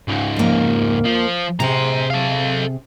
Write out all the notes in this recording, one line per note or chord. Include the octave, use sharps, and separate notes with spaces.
C#2 G#2
F2 A#3
F3
C3 G#4 C5 A#5
A4 F5